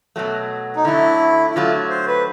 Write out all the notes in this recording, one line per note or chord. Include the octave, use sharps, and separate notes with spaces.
B2 F#3 A3
D#4
D3 F#3 A3 E4
E4
D3 F#3 A3 F4
C5
B4